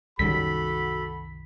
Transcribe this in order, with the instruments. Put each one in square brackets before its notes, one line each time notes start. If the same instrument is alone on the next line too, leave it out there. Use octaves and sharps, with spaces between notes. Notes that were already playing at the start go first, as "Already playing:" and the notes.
[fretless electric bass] C2 F#2 D#3 [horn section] F#4 A4 B5 [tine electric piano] B6